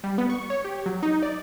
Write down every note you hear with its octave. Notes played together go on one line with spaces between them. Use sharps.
G3
B3
C#6
C#5
G4
F#3
D#4
D5